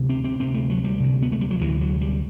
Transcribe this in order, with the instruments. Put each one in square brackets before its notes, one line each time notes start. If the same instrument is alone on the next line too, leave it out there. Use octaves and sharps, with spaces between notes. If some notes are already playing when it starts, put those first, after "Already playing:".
Already playing: [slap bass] D2 C3
C4
C4
D2 C3 C4
A3
F#3
G3
D2 C3
B3
A3
G3
F#3
D2 C3 E3
F#3
G3